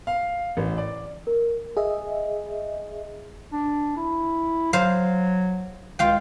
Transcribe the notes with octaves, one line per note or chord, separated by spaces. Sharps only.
F5
A1
D5
A#4
G#4 D#5 E5
D4
E4
F#3 C5 F5
C#2 F4 F5 G5